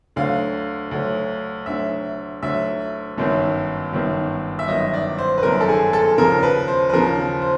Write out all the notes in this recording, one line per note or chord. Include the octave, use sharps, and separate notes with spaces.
D2 D3 F#3 F5
D2 D3 F#3
D2 D3 F#3 E5
D2 D3 F#3 E5
G1 F#2 D#3 F#3
G1 F#2 D#3 F#3
E5
G1 F#2 D#3 F#3 D#5
D5
C5
B4
G1 F#2 D#3 F#3 A#4
A4
G#4
A4
D#2 C#3 F3 A#4
B4
C5
B4
D#2 C#3 F3 A#4
C5